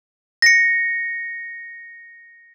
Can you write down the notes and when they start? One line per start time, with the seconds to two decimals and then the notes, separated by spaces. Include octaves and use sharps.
0.42 A#6 C#7